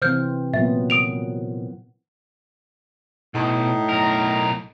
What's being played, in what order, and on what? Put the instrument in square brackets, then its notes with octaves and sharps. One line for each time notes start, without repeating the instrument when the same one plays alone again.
[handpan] C3 E3 C4 [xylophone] C5 F6 G6
[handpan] A#2 F#3 B3 [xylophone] E5
[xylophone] D#6 D7 F7
[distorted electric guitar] B1 [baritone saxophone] A2 [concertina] D#4
[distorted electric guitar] B1 A#4